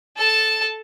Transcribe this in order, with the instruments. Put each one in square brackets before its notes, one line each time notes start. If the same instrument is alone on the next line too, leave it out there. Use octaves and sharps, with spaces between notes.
[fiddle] A4 A5